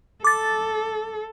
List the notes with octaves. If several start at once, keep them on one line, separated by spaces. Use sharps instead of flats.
A4 D6 A6